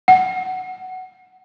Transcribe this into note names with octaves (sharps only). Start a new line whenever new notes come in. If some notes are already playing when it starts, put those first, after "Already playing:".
F#5